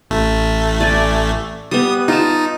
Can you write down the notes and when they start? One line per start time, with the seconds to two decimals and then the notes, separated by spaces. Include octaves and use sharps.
0.10 A1 A3
0.80 D5 G#5
1.71 G3 B3 D#6
2.08 D#4 F4 A5